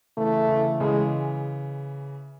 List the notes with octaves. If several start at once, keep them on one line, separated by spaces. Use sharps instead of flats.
C#3 E3 A3
C#3 E3
C#3 E3 G#3